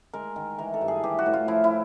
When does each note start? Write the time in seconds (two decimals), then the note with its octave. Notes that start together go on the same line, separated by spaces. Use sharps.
0.13 G#3 A#4
0.36 D#3
0.58 E3 A#4
0.74 A4
0.81 G2
0.88 G#4
1.04 E3 G4
1.19 F#4
1.26 A2
1.33 F4
1.48 F3 E4
1.64 E4